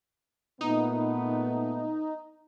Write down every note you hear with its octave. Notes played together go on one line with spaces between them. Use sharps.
A#2 A3 B3 D#4